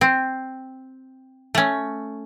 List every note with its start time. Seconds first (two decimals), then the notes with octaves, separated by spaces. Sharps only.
0.01 C4
1.55 A3 C#4